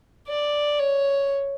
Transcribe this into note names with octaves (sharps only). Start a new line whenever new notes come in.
D5
C#5